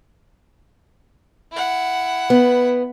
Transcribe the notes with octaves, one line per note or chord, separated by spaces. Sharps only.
E4 F#5
B3